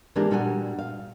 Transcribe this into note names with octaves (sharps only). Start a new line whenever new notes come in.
E3 G#3 A#3 D4 G4 A#4
A#2 G3 D4 F#4 G5 G#5
F5